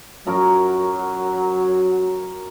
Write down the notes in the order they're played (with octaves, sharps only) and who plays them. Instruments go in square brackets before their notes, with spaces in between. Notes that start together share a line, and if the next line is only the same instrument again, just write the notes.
[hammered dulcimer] F#2 A#4 A#5 [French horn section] F#3